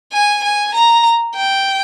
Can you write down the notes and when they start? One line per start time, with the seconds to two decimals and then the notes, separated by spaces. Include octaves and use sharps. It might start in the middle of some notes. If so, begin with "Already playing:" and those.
0.13 G#5
0.44 G#5
0.74 A#5
1.35 G5